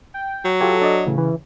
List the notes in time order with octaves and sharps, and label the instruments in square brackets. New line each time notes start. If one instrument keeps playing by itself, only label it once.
[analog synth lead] G5
[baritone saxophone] F#3
[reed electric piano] F4 G4 C#5 [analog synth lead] A4
[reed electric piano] D4 D5 D#5
[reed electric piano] A2 E3 [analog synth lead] C#3
[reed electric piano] E3